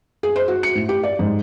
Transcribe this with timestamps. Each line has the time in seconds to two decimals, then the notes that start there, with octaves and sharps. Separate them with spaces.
0.23 G#4
0.36 C5
0.48 F#4
0.63 C#7
0.75 A2
0.89 G4
1.03 D5
1.19 G#2